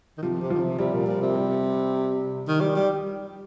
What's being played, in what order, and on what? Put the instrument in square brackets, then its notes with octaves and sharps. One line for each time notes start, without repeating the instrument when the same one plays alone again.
[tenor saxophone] D#3
[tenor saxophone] C3 [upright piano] F3
[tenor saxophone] C3
[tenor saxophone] D#3 [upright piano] F3
[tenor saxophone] C3
[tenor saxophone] C3 [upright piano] G3
[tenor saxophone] A#2
A#2
C3
[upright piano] G3
[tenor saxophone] D#3
G3
G3